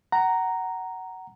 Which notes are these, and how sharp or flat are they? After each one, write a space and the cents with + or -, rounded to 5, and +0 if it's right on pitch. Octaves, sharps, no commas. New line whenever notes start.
F#5 +20 A#5 +0